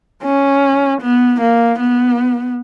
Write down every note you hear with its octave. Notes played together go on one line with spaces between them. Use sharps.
C#4
B3
A#3
B3